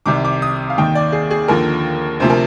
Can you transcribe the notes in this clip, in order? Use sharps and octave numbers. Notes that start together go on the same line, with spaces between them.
C2 C3 D#3 D6
D6
D#6
F5
D#2 D#3 G5
D5
G#4
G#4
D#2 D3 F3 A#4
D2 C3 F3 C5
A#4